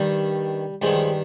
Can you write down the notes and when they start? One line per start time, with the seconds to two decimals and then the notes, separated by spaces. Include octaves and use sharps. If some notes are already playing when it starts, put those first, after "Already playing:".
Already playing: G2 D#3 G3
0.82 G2 D#3 F3 G#3